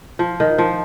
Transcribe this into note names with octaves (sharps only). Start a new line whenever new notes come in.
F3
D#3
F3